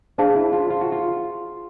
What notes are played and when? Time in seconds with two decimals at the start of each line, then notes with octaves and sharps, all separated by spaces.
0.18 D4 G#4 C5 F5 A5
0.36 E4
0.53 F4
0.70 F4
0.81 F#4
0.92 F4